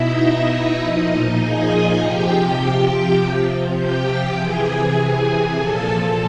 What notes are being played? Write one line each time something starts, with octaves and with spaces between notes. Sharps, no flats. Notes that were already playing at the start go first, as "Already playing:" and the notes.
Already playing: B2 D#4 E4 D#5 E5
D#4 D#5
A#2 F3
G#4 G#5
C3 F3 G4 G5
C3 F3
G4 G5
C3 E3 G#4 G#5
A#2 F3 A4 A5